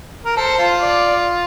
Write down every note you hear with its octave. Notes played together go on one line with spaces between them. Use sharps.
A#4
A4 C5
F4
D5